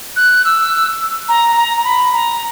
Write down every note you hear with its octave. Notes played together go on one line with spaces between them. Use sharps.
F#6
E6
A#5
A#5
A#5
B5
A#5